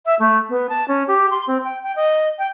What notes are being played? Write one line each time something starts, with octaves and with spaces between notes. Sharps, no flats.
E5
A3
B3
A5
C#4
G4
C6
C4
G5
G5
D#5
G5